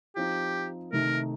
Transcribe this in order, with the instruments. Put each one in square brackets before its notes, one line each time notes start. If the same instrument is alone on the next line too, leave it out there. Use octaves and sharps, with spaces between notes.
[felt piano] F3 C4 D#4 [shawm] G4
[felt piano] C3 D#3 A3 D#4 [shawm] A#4